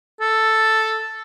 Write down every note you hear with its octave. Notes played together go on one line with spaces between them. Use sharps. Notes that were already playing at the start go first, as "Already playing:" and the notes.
A4